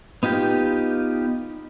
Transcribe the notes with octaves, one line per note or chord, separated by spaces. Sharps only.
B3 D#4 F4 G4 G6